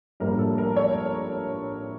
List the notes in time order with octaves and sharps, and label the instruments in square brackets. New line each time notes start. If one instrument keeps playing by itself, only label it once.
[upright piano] A#1 A2 G3 A#3 A#4
A4
A#4
A4 C#5